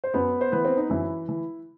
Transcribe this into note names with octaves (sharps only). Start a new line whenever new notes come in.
C5
F#2 B3 B4
C5
E3 B3 B4
C4
D#4
F#2 E3 E4
E3